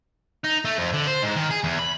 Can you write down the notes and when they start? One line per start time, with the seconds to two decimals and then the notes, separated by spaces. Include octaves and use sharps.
0.45 D#4
0.65 A3
0.78 F2
0.93 D3
1.07 C5
1.22 G#2
1.36 D#3
1.51 G#4
1.64 E2
1.79 B5